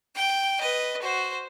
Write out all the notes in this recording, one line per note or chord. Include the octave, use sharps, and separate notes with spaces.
G5
B4 D#5
F#4 C5